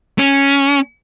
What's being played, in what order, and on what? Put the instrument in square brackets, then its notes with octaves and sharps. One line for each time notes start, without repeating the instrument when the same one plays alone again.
[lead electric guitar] C#4